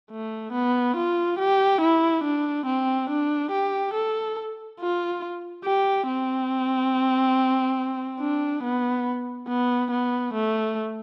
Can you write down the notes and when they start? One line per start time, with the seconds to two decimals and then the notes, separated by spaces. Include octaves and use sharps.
0.11 A3
0.53 B3
0.96 F4
1.39 G4
1.81 E4
2.24 D4
2.66 C4
3.10 D4
3.51 G4
3.94 A4
4.80 F4
5.64 G4
6.07 C4
8.20 D4
8.63 B3
9.48 B3
9.91 B3
10.34 A3